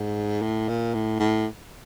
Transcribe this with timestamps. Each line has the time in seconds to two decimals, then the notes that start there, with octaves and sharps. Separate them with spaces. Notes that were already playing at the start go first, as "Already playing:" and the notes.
Already playing: G#2
0.42 A2
0.68 A#2
0.94 A2
1.19 A2